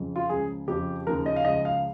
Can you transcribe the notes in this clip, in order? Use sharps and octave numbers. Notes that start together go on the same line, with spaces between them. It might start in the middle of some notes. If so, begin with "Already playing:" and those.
Already playing: F2 C#3 F3
F4
C#2 C#3 F3 G#4
F2 C#3 F3 G4
D#2 C#3 F3 A#4
D#5
F5
C#2 C#3 F3 D#5
F5